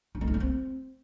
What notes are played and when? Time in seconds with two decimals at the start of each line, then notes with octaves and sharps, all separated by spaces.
0.15 D4
0.21 A3
0.27 D#4
0.34 B3
0.40 C4